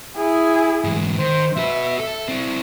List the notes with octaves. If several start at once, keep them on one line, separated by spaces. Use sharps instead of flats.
E4 G#4
G#2 E3
D#3 C5
F#4 B4 E5
A4
C4 E4